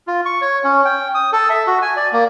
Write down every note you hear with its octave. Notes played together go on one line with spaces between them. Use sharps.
F4
C#6
C#5
C#4
G5
D#6
A4
E5
F#4
G#5
D5
A#3